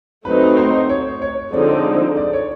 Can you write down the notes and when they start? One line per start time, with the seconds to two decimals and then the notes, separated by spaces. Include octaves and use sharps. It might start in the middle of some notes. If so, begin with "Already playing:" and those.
0.25 F#3 A3 C4 D#4 B4
0.57 C5
0.89 C#5
1.22 C#5
1.53 D3 F3 G#3 C4 D#4 D5
2.17 D5
2.33 C#5